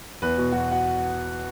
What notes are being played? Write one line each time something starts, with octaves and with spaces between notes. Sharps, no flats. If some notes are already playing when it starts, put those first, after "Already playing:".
E2 B4
B2
E2 F#4
F#4